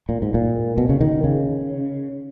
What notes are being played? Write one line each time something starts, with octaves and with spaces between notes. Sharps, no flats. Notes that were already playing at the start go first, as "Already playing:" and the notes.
A#2
G#2
A#2
B2
C#3
D#3
C#3